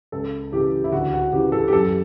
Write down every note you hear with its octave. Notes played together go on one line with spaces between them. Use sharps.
C#2 A4
C#3 E3 G4
E4
D2 F#4
F#4
C#3 E3 G4
A4
G4
F#2 A4